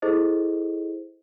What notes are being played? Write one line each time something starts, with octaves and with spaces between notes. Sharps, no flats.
E4 G#4 A4 C5 D#5